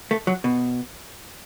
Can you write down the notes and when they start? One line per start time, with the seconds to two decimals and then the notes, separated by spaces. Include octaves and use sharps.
0.11 A3
0.27 F#3
0.44 B2